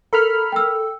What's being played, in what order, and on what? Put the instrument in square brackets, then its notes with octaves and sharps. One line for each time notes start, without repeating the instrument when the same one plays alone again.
[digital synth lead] A4 [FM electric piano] A#4 B5 F6
[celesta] G5 E6